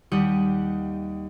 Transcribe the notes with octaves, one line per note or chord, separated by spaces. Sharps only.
D#2 G3 G4 F#5 D#6